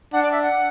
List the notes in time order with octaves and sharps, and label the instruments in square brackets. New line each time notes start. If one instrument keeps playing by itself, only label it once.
[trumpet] D4 [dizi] F#5
[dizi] D5
E5
F#5